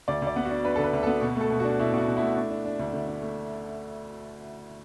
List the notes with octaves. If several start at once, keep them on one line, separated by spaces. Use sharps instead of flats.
D2 D5
D2
D5
B3
F#4
D4
D4 B4
A4
D3 B4
D2
B3 A4
B2
A3 A4
B2
D4 F#4
B2 E4
B2 F#4
B2
E4
A3
D4
D4
D4
D2
D2
D4
A3